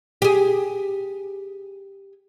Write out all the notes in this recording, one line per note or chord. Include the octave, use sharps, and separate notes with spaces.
G4 G#4